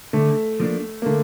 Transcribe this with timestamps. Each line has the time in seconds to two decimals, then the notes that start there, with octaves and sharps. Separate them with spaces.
0.13 D3 A3
0.60 F3 A#3 D4
1.02 A#3
1.06 D3 A3